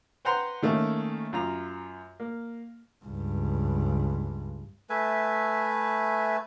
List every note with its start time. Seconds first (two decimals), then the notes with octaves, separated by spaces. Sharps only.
0.25 B4 C5 F#5 G5 A#5 C6
0.62 D#3 A3 A#3 C#4
1.33 F#2 F4 A#5
2.20 A#3
3.05 C#2 G2
4.90 A3 B4 E5 G#5